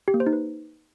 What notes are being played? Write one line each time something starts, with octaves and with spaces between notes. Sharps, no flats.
G4
A#3
C5
D#4
B4